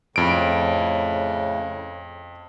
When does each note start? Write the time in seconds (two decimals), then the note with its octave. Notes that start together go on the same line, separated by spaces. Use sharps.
0.16 F2 A2 C#3 D7